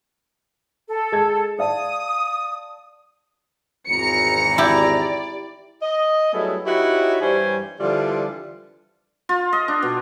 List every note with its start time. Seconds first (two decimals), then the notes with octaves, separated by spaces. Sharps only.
0.89 A4
1.12 G#3 G#6
1.59 D5 F5 A5 D#6
3.88 G#1 E2 A#5 C#7
4.58 E4 G4 D5
5.82 D#5
6.33 F#3 G3 A3 B3 E4 G#4
6.66 D#4 E4 F#4 G4 B4 C#5
7.21 G2 E3 G3 C5 C#5 G#5
7.80 D3 E3 F3 G3 F4
9.29 F4
9.53 D#5
9.68 D4
9.83 B2